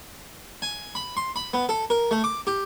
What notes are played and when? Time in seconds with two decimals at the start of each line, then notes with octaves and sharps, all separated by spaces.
0.62 G#5
0.95 B5
1.17 C6
1.36 B5
1.54 B3
1.69 A4
1.90 A#4
2.11 A3
2.24 D6
2.47 G4